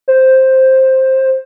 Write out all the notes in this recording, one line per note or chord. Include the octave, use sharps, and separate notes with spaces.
C5